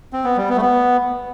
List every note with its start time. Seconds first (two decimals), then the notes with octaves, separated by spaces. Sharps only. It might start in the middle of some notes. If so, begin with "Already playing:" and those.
0.13 C4
0.24 B3
0.37 G3
0.49 B3
0.56 A3
0.61 B3